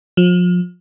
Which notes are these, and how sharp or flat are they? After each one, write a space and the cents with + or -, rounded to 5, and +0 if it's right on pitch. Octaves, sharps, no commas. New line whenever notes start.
F3 +35